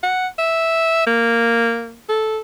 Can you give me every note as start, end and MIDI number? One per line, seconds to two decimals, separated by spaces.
0.03 0.27 78
0.38 1.04 76
1.07 1.98 58
2.09 2.40 69